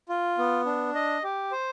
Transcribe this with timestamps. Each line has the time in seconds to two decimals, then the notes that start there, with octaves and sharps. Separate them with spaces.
0.09 F4
0.38 B3
0.66 D4
0.95 D#5
1.24 G4
1.52 C5